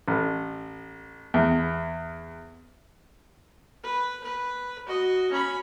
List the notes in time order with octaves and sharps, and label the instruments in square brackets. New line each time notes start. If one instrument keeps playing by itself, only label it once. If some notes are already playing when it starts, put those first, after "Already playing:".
[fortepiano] A1
E2
[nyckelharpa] B4
B4
F#4 D#5
C#4 B5